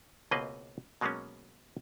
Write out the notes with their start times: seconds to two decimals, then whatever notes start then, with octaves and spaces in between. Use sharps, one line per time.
0.31 C#2 B2 A#3 C4 B4 D#5
1.01 B2 F#3 G#3 A#3 B3 C#4